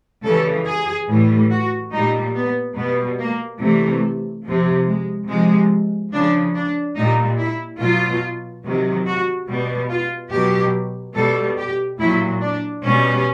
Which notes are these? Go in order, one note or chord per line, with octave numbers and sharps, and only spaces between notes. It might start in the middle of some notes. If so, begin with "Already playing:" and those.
C#3 E3 G3 A4
G#4
A2 E3 G3
F#4
A#2 G3 D#4
B3
B2 G3 B3
A#3
C3 E3 G3 A3
C3 F3
G#3
C3 F3 G#3
C#3 F3 D4
D4
A#2 G3 D#4
E4
B2 F#3 F4
C3 D#3 F#3
F#4
B2 G3
F4
B2 F#3 G4
B2 G3 A4
G4
A#2 F#3 E4
D4
B2 G3 C#4